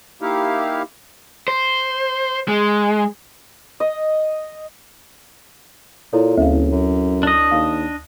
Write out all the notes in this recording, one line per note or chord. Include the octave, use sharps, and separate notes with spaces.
A#3 D#4 E4 G4 F5
C5
G#3
D#5
A#2 E4 A4 C#5
F#1 D2 F5
F#2
D4 D#5
D#2 F5